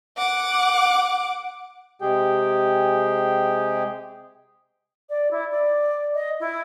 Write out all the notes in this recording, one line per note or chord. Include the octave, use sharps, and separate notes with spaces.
F#5 D6
C3 G#3 G4 G#4 G5
D5
E4
D5
D#5
E4